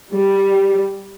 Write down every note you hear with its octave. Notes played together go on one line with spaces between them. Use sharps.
G3